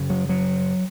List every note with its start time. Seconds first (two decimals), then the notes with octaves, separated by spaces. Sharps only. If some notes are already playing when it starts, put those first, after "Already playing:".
Already playing: F#2 C#3
0.10 F#3
0.29 F#3